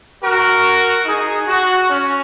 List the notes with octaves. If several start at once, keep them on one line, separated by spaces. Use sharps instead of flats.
F#4 A#4
D#4 G#4
F#4
C#4